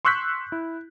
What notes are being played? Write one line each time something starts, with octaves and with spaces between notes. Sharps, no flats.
C6 C#6 E6 F#6 G6 B6
E4